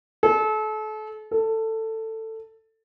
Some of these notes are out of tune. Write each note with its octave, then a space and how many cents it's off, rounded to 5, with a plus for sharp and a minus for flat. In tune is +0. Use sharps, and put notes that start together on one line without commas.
A4 -35
A4 +15